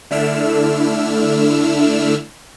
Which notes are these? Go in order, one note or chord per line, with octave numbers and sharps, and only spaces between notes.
D3 A3 D4 E4 E6 F6